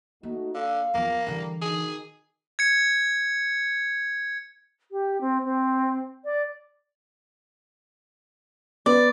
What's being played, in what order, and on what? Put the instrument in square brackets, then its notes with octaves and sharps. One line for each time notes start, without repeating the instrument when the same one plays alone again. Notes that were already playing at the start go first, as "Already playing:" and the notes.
[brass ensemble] A3 D#4 F#4 [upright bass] A#3
[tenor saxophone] D3 [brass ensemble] F5
[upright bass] E2 F3 [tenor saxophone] A#3
[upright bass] D3 E3 [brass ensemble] G3
[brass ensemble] B2 D#3 [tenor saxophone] G#4
[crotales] G#6 C#7
[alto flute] G4
C4
C4
D5
[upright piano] B3 [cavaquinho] D5